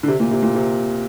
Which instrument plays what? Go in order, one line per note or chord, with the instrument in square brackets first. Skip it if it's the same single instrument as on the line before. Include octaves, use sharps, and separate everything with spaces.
[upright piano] D3
C3
A#2
C3
A#2
C3